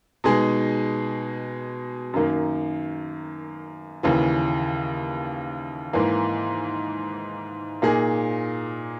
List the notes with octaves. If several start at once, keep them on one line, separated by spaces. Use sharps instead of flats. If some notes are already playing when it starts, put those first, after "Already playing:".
B2 G#3 D#4 G#4
F#2 D#3 A#3
D#2 C#3 E3
G#2 E3 A#3
A#2 A#3 D#4 G#4